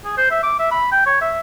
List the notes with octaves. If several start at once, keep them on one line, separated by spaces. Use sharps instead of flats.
G#4
C5
E5
D6
E5
B5
G5
C#5
E5